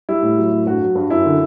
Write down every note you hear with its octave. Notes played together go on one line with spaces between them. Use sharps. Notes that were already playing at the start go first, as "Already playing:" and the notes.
G3 E4
A2
F#3
A2
G2 F#4
F#3
G2
F#2 E4
D3